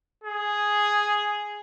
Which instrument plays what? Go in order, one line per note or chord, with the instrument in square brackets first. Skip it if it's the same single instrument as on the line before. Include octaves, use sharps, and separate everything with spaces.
[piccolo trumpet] G#4